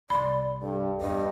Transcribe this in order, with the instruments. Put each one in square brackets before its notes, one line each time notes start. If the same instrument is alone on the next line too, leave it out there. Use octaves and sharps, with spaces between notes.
[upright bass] C2 C3 [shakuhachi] D5 [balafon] B5 C6
[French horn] G2 [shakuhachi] A4
[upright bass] E2 A#2 [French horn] G2 [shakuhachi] D#5